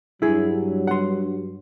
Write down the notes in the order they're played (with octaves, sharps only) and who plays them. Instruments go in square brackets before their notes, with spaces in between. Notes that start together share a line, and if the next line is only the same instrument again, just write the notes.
[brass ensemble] G2 F#3 [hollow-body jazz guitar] E4 G#4
[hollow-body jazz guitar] F#5 C6